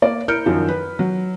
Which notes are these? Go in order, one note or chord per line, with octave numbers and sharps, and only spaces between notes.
A#3 D5
E4 A#4 F6 G6 C#7 D7
F#2 D#3 F3
B4
F#3